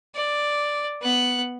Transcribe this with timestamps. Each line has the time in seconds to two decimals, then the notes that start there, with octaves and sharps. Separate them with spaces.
0.15 D5
1.02 B3 F#6